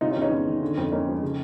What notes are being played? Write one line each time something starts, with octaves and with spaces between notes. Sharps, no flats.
C3 D#4 F4
C#4 D#4
E2
C#4 D#4
E2
D#3
D3
F2
A#3 C#4 D#4
F3
C#3